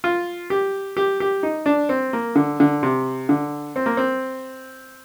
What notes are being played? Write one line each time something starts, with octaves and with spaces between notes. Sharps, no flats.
F4
G4
G4
G4
D#4
D4
C4
A#3
D3
D3
C3
D3
C4
A#3
C4